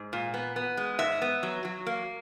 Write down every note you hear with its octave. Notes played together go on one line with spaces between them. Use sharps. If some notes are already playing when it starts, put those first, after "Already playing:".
Already playing: G#2
A#2
B3
B3
G#3
G#2 E5
B3
F#3
F#3
A#3